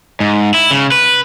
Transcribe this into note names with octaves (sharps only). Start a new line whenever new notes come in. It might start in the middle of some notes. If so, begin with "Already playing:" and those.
G#2
E4
C#3
B4